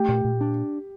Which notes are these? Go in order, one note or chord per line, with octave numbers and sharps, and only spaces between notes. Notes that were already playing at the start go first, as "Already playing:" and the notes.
Already playing: A3 G4
A#2
A#2
D4